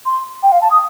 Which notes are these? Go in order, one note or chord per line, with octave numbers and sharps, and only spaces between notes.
C6
G5
F5
A5
D#6